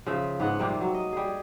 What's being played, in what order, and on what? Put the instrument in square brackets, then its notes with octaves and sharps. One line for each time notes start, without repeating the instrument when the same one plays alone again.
[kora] C#3 F3 E5
G#2 B3 F#5
C3 F3 G3 A#3
F#3
D#5
G3 G#4